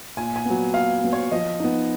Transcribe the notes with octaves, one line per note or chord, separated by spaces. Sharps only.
A#2 G#5
G#5
F#3 B3
A#2 F5
F#3 B3
C#5
F3 D#5
B3 D#4